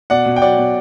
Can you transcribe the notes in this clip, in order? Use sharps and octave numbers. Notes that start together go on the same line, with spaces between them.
B2 D5 F#5
B2
G5
F#3 D5 F#5
B2